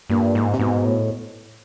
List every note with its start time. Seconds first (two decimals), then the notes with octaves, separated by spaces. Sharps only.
0.10 G2 A#2
0.35 G#2
0.53 C3
0.59 G#2 B2
0.85 A2